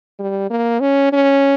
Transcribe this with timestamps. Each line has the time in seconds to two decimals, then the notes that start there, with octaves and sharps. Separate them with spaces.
0.19 G3
0.50 A#3
0.80 C#4
1.12 C#4